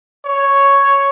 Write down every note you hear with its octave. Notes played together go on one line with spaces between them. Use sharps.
C#5